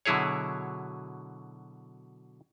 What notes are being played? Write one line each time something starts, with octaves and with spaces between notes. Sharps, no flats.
B2 D3 F#3 E4 G#4 C#5